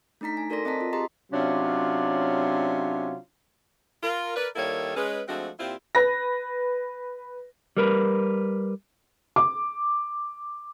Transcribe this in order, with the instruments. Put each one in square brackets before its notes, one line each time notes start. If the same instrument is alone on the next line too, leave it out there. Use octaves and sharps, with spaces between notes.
[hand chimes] A3 D4 D#4 A#5 B6
G#5
F#4 A4 A#4 D5 C6 A#6
C4 D#5 A5 A#5 B6
F4
G4 G#4 D#5 A#5 C6
[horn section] C3 F#3 C#4 D4 F4
[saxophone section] F4 A#4
A#4 B4 D5
D#3 G3 A#3 E4 A4 C#5
G#3 C#4 B4
F3 G#3 A3 C4 D4 F#4
A#2 C4 E4 F4 G4
[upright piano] B4 A#6
[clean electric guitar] G3 A#4 B4
[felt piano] D6